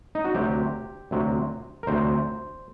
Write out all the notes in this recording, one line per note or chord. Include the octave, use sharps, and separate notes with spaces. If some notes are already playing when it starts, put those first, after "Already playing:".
D#4
F#4
D2 C3 F#3 G4
D2 C3 F#3
A#4
D2 C3 F#3 C5